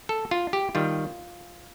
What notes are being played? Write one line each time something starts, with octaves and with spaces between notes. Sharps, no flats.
A4
F4
G4
D#3 G3 F4